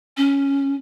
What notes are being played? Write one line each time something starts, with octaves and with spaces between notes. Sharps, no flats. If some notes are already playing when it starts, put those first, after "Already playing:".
C#4